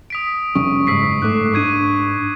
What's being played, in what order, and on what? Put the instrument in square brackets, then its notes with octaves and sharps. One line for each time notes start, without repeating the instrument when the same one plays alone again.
[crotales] D#6 B6 D7
[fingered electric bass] F1 G3 C#4 [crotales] C#6
[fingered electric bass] F#1 G#2 [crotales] E6 B6 C7
[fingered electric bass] G#2 A3 [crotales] C#6 D6 F#6
[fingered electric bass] G#2 D4 [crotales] C#6 G#6 D#7